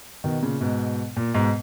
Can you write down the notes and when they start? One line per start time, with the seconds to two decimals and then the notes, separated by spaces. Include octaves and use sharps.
0.24 B2 D#3
0.42 A#2 C#3
0.61 G#2 B2
1.17 A#2
1.34 G#2 B2